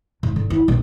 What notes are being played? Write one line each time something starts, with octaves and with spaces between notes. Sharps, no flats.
G#2
D3
E4
A#1 D#4